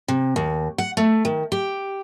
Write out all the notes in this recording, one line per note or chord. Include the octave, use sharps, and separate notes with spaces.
C3
D#2
F#5
A3
D#3
G4